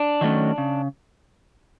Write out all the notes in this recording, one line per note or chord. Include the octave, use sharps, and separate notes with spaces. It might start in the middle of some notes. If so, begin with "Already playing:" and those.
Already playing: D4
D#3 F#3 A3 C#4
C#3